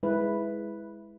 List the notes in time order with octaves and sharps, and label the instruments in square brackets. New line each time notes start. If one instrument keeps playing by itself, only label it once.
[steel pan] G#3 E4 B4